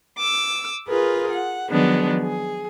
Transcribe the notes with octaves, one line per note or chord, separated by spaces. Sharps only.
D6 E6
F4 G#4 A#4 B4
F#5
D#3 F3 F#3 G#3 B3 D4
G#4